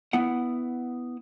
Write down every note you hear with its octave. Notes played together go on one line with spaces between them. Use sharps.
B3 E4 F#5